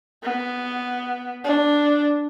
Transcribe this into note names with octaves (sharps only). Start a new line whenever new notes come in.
B3
D4